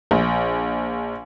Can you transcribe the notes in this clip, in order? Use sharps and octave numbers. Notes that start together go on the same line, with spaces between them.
A#1